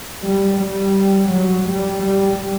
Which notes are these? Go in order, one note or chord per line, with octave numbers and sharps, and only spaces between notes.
G3
G3
F#3
G3
G3